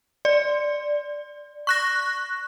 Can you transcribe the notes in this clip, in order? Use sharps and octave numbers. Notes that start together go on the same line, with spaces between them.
D5
C#6 F#6 A#6